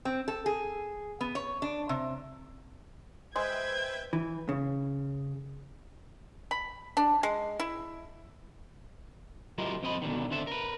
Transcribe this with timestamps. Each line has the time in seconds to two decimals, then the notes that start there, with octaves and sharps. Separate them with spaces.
0.05 C4
0.28 A4
0.46 G#4
1.21 B3
1.35 C#5
1.62 D4
1.89 C3
3.36 G#3 B4 C5 E5 G5 G#6
4.13 E3
4.49 C#3
6.51 B5
6.97 D4
7.23 G#3
7.60 E4
9.58 F#3 E4 F4 G4 A#4 D#5
9.83 F2 C4 D#5 B5
10.02 B2 D3 D#3
10.31 D3 C4 D4 A4 E5
10.47 A#4 B4